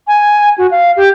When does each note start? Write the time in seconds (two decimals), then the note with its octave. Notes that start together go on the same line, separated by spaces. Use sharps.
0.08 G#5
0.58 F#4
0.71 F5
0.97 G4